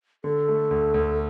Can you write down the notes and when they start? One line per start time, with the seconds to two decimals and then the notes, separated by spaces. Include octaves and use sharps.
0.24 D3 A4
0.48 A3
0.71 D2
0.94 D2